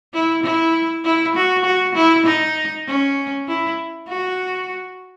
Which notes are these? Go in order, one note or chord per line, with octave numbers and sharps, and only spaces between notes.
E4
E4
E4
F#4
F#4
E4
D#4
C#4
E4
F#4